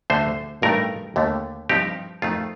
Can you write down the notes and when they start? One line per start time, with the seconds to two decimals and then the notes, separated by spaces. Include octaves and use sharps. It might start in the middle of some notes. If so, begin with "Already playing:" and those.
0.10 D2 D3 A3 C5
0.62 A1 G2 D#3 A3 D#4 A#4
1.16 D#2 D3 A3
1.69 G2 F3 C4 D#4 G4
2.22 F2 D#3 A3 F4